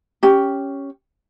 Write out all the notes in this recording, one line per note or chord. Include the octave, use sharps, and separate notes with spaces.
C#4 G4